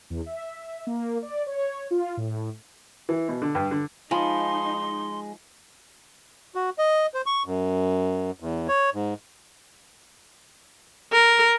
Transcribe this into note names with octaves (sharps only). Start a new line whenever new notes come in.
E2
E5
A#3
D5
C#5
F4
A2
E3
B2
D3
G2
D3
F3 G#3 D#4 G#5 B5 C6
F#4
D#5
C5
C#6
F#2
E2
C#5
G#2
A#4